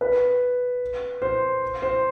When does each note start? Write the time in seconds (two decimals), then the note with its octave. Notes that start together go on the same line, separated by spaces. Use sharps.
0.01 B4
1.22 C5
1.82 C5